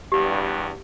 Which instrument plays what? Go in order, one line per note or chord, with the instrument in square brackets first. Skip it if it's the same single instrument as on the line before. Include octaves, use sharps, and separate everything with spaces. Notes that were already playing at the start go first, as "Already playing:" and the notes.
[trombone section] E2 G2 [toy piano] G4